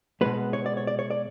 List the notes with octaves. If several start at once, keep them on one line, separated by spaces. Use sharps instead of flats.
B2 G#3 B3 B4
C#5
D5
C#5
D5
C#5
D5